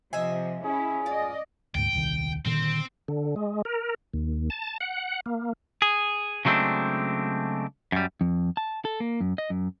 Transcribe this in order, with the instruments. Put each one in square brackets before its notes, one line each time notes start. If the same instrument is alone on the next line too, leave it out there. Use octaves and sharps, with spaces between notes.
[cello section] C3 F3 [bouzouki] D#5 E5 G#5
[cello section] C#4 E4 [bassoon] G#4
[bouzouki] F4 [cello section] D5 D#5
[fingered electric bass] D2 G#2 [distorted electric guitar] G5
[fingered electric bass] D#1 C2 D#3
[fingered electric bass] A#2 D3 D#3 [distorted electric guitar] C4
[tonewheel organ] D3
G#3
A#4
D#2
A5
F#5
A#3
[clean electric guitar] G#4
C#3 F#3 G#3 A3 C4 D4
F#2 G3
F2
A5
A4
A#3
F#2
D#5
F#2